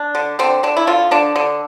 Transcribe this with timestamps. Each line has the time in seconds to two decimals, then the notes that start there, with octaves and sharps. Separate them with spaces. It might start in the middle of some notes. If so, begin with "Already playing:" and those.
Already playing: D4
0.15 D3
0.39 D3 C4
0.63 D3 D4
0.77 E4
0.87 D3 F4
1.11 D3 D4
1.36 D3